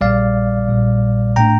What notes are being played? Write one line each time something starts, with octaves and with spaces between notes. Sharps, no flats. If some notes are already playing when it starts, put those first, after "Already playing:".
A#1 A#2 G3 D5 F5
A#1 A#2 G3
A2 A3 D4 G5 A#5